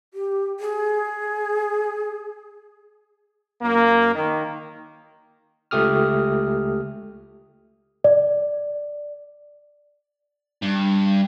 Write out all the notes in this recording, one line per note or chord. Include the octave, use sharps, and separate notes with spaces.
G4
G#4
F#2 A#3
D#3
C#2 A3 G4 D#6 F6
D5
G2